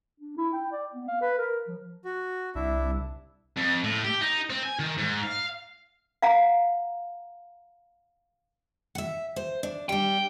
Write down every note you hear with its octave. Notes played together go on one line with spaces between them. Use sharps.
D4
E4
G5
D5
B3
F5
B4
A#4
F3
F#4
C2 D4 E4 E5
F2
A2
G4
D#4
C4
G#5
D#3
G#2
F5
F5 F#5 A#5
E5 F#5
C5
D4
G3 D4 G5